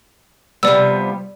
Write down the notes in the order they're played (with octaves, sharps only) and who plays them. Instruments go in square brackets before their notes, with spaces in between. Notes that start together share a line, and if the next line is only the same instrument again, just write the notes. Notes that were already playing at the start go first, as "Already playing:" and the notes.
[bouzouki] C3 F3 B3 [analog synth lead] G3 [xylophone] D5 E6